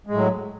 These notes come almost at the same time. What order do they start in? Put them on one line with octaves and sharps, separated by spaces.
G#3 A2 F#3